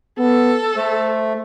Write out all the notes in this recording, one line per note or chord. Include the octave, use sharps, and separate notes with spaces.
B3 A4
A3 C5